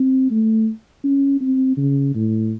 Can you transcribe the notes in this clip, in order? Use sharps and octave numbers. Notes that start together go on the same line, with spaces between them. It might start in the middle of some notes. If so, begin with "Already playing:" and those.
Already playing: C4
A3
C#4
C4
C#3
A2